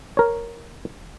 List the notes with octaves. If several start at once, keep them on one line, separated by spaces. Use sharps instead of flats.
A#4 C#5